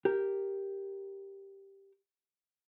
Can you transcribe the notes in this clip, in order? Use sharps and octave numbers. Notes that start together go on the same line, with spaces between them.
G4 A#4